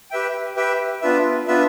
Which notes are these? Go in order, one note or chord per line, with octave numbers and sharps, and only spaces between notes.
G4 B4 E5 G5
G4 B4 E5 G5
B3 D4 F4 B4 E5
B3 D4 F4 B4 E5